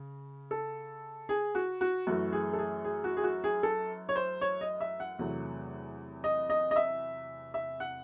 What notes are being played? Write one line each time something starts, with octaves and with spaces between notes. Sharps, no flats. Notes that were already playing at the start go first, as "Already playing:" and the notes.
Already playing: C#3
A4
G#4
F#4
F#4
F#2 E3 A3 F#4
G#4
A4
G#4
G#4
F#4
G#4
F#4
G#4
A4
C#5
C5
C#5
D#5
E5
F#5
E2 C3 F#3 A3
D#5
D#5
D#5
E5
E5
F#5